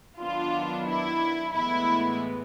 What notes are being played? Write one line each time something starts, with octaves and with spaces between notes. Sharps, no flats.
D#3 F#3 B3 D4 F4
E4
A2 E3 G#3 B3 E4